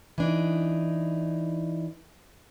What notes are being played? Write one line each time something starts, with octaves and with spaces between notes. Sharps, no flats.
E3 D4 D#4